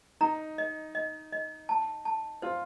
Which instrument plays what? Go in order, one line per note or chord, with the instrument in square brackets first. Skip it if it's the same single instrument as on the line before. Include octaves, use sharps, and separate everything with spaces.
[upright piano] D#4 [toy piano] A#5
[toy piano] D#5
D#5
D#5
A5
A5
[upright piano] F4 [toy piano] C5